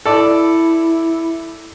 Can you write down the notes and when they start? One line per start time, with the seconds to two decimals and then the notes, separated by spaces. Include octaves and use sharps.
0.06 E4 A4 D5